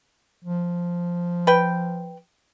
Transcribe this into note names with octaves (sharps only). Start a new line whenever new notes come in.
F3
B4 G5